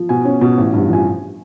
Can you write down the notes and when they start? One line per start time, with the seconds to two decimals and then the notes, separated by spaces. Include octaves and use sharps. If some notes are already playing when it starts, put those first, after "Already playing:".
Already playing: F3
0.09 B2 G#5
0.25 C#4
0.41 B2
0.58 A1
0.74 G2
0.89 F3 G#5